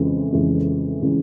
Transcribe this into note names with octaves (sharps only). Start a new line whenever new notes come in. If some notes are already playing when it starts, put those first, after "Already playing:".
Already playing: F2 C#3 E3 G#3 C#4
F2 C#3 E3 G#3 C#4
C#3 E3 G#3 C#4